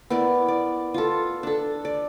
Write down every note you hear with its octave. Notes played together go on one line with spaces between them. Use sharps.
B3 E4 A#4 D5
D5
F4 A4
D4 A4
D5